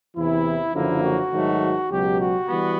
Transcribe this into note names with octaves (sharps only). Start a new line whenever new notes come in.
E2 C3 E3 E4
F#1 F#2 D3 F3 A#3 E4
F#4
G#2 D#3 F#3 A3
C#2 B2 F#3 G4
F#4
E3 G3 B3